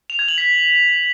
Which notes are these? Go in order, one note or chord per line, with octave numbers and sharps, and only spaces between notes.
F7
G#6
F#7
B6